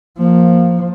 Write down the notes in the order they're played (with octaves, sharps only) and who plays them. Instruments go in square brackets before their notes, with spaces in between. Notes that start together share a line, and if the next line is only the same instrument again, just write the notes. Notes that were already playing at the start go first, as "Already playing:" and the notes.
[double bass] F3 [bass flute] A#3